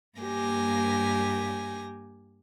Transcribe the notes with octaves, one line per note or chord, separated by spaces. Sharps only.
G2 A#3 G4 G#5 A#6